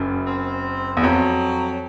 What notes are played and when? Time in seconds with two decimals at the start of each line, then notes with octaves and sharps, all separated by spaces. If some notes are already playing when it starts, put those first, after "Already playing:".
Already playing: F#1 F#2
0.26 C4
0.97 E2
1.02 F2 F#3